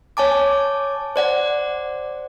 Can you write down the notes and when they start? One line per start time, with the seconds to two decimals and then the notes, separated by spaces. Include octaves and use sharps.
0.17 C#5 G#5 A5 D6
1.16 C5 D5 F#5